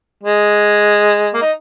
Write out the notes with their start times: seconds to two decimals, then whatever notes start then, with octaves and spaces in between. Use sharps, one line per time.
0.23 G#3
1.34 A#3
1.42 D#4